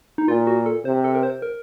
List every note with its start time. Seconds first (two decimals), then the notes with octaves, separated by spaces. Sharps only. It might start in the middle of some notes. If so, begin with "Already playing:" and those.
0.18 D#4
0.28 A#2 F4
0.47 F#4
0.66 A4
0.85 C3 C5
1.04 A4
1.15 A#4
1.23 C5
1.42 A#4